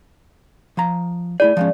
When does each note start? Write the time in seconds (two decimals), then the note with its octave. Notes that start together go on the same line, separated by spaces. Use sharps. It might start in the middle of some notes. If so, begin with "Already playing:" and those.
0.77 F3 A#5
1.40 A3 E4 G#4 D5
1.57 F3 G#3 C#4